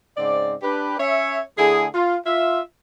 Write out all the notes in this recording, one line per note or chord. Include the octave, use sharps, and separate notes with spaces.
G#2 C#3 C4 D5
D4 G4 B4
C#4 C#5 E5
D3 A3 E4 G#4
F4
F4 E5